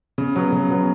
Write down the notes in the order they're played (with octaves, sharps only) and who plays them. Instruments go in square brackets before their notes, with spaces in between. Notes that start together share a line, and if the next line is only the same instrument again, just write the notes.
[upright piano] C#3
F#3 B3
C#3
F#3 B3